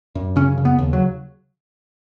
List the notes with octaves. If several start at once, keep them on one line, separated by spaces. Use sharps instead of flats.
F#2
C#3 C#4
C#3
B3
D#2
F#3